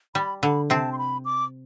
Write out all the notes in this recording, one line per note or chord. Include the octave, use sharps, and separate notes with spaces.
G3 B5
D3 B5
C3 C4 A5
C6
B5
D6